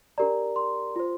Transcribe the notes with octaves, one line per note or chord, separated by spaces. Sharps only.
D4 G4 A#4 D5 A#5
C6
F4 C5